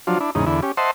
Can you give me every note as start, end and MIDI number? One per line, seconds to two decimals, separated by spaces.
0.07 0.18 53
0.07 0.18 54
0.07 0.18 62
0.07 0.18 65
0.20 0.31 62
0.20 0.31 64
0.35 0.45 40
0.35 0.45 44
0.35 0.45 49
0.35 0.45 63
0.46 0.61 40
0.46 0.61 50
0.46 0.61 64
0.63 0.72 61
0.63 0.72 67
0.77 0.91 72
0.77 0.91 75
0.77 0.91 76
0.77 0.91 78
0.77 0.91 81
0.77 0.91 84